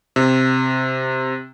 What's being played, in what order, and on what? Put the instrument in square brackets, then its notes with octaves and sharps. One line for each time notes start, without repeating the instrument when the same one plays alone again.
[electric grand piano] C3